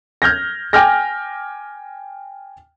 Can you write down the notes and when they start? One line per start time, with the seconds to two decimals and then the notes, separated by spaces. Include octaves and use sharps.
0.22 F6 G6 G#6 A#6
0.73 G5 G#5 D6 F6 G6 A#6